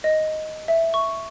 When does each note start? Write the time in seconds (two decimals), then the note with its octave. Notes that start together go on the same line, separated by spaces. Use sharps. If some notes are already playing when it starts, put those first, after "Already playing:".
0.04 D#5
0.68 E5
0.94 C#6